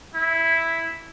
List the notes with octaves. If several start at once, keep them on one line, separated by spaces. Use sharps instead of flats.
E4